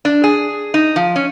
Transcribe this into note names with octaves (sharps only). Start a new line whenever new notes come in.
D4
G#4
D#4
F3
C#4